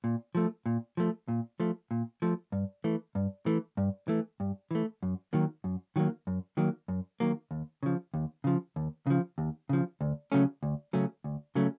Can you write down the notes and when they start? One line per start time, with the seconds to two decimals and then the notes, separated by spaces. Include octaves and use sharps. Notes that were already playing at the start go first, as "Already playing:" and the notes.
0.04 A#2
0.35 F3 A3
0.66 A#2
0.97 F3 A3
1.28 A#2
1.60 F3 A3
1.91 A#2
2.22 F3 A3
2.52 G2
2.84 E3 A3
3.15 G2
3.46 E3 A3
3.77 G2
4.08 E3 A3
4.40 G2
4.71 E3 A3
5.03 F#2
5.33 D#3 F#3 A#3
5.64 F#2
5.96 D#3 F#3 A#3
6.27 F#2
6.57 D#3 F#3 A#3
6.88 F#2
7.20 D#3 F#3 A#3
7.51 D#2
7.83 C#3 F3
8.14 D#2
8.44 C#3 F3
8.76 D#2
9.07 C#3 F3
9.38 D#2
9.69 C#3 F3
10.01 D2
10.32 C#3 F#3 A3 C#4
10.63 D2
10.93 C#3 F#3 A3 C#4
11.24 D2
11.55 C#3 F#3 A3 C#4